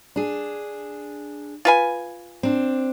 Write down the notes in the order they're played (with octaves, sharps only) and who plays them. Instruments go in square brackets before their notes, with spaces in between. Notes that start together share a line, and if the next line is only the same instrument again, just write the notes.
[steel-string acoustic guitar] D4 G#4
[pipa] F4 B4 G#5
[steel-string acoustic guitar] C4 D4